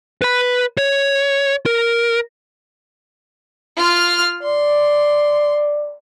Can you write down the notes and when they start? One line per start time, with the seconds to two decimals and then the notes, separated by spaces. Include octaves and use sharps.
0.22 B4 B5
0.78 C#5
1.66 A#4
3.76 F4 F6
4.43 D5 C6